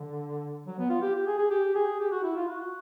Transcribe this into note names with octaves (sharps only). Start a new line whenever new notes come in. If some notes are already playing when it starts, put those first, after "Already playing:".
Already playing: D3
F#3
B3
F4
G4
G4
G#4
G#4
G4
G#4
G4
F#4
E4
F4
F#4